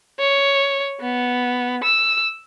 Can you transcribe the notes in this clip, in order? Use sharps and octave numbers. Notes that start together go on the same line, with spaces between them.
C#5
B3
E6